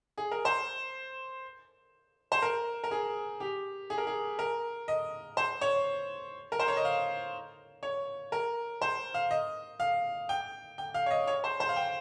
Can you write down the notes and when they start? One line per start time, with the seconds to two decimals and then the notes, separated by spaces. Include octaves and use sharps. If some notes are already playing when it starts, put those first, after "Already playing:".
0.18 G#4
0.31 A#4
0.45 C5
2.32 C5
2.42 A#4
2.84 A#4
2.91 G#4
3.40 G4
3.90 G#4
3.98 A#4
4.07 G#4
4.39 A#4
4.88 D#5
5.37 C5
5.61 C#5
6.52 A#4
6.59 C5
6.68 C#5
6.77 D#5
6.85 F5
7.83 C#5
8.32 A#4
8.82 C5
9.14 F5
9.31 D#5
9.80 F5
10.29 G5
10.78 G5
10.94 F5
11.06 C#5
11.11 D#5
11.27 C#5
11.44 C5
11.60 C5
11.69 F5
11.76 G5